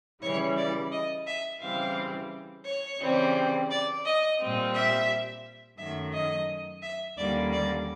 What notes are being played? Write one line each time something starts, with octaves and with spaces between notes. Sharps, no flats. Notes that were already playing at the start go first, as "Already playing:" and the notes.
C#3 E3 G3 C#5
D5
D#5
E5
C#3 E3 G3 C4 F5
C#5
C#3 E3 G3 C4
D5
D#5
A#2 G3 C4
E5
F#2 D#3 F#3 A3 E5
D#5
E5
D#2 D3 G3 A#3 C#4 D5
D5